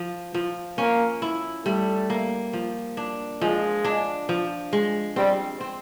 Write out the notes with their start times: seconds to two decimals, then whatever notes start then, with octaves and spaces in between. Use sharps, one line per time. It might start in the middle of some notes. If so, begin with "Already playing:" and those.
Already playing: F3
0.34 F3
0.78 A#3 C#4
1.22 E4
1.66 G3 A3
2.10 A#3
2.53 F3
2.97 D4
3.41 F3 G#3
3.85 D4
4.29 F3
4.73 G#3
5.16 G3 C4
5.61 C4